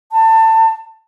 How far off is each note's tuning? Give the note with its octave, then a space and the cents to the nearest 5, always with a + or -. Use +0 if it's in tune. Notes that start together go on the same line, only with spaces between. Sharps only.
A5 +25